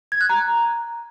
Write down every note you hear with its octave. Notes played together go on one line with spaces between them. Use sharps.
G#6
F#6
A#5